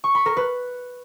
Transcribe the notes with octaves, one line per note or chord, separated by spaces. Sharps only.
C#6
B5
A#4
B4